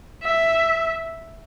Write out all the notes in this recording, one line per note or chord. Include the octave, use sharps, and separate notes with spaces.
E5